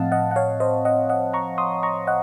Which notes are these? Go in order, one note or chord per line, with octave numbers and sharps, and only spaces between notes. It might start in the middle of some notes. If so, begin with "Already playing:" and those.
Already playing: A2 F3 C4 D#5 F5 F#5 A5
D#5 F#5
F#5
C#5 F5
C5 D#5
D#5 F#5
D#5 F#5
A#5 C#6
C6 D#6
A#5 C#6
D#5 F#5